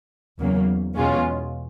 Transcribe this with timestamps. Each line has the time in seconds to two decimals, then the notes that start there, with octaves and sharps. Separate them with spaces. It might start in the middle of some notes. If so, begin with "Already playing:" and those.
0.39 E2 C#3 F#3 A#3
0.96 E2 B2 G#3 C#4 F4